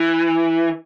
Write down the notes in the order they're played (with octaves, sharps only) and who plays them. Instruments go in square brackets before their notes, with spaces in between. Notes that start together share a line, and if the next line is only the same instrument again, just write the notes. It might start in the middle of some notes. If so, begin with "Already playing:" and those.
Already playing: [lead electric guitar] E3